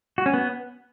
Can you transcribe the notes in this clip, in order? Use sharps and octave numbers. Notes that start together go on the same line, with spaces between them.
F#4
C#4
B3